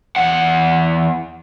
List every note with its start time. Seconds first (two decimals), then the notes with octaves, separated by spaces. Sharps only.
0.16 E2 F#5